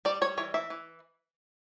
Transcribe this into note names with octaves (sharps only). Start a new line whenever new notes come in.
G3 D5
G3 C#5
E3 C#5
E3 E5
E3